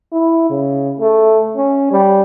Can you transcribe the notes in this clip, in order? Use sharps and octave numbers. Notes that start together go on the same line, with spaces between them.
E4
C#3
A3
C#4
G3